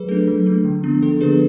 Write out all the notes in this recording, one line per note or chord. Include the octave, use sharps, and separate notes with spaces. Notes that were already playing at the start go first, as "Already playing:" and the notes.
Already playing: F#3 G#4 B4
A3 D4 A4
F#3
A3 D4
D3
F3 B3 D4
D3 A4
F3 B3 D4 G#4 B4